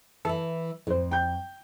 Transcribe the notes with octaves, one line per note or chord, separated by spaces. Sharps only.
E3 E4 A4
F2 A2 C5
G5 G6